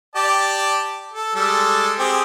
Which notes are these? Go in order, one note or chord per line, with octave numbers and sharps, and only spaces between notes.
G4 D5 A5
A4
G3 G#3 A4
C4 G4 G#4